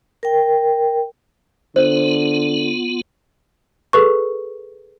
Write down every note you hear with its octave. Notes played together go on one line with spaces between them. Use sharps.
A#4 G5
D3 B3 F4 C5
G#4 A4 B4 C#6